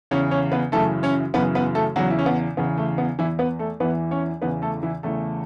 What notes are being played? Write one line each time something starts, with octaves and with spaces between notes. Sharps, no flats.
E2 C#3 E3 C#4
C#4 C#5
B3 B4
F#2 C#3 E3 A3 A4
C#4 C#5
F#2 C#3 E3 B3 B4
B3 B4
A3 A4
E2 C#3 E3 F#3 F#4
E4
C#4
B3
E2 C#3 E3 B3
A3
B3
E2 E3 E4
B3 B4
A3 A4
E2 E3 B3 B4
C#4 C#5
E2 C#3 E3 B3 B4
A3 A4
E3 E4
E2 C#3 E3 A3 A4